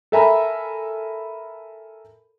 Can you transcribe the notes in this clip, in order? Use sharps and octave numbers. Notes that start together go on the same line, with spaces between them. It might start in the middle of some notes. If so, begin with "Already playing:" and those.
A4 A#4 E5 G#5 A#5 B5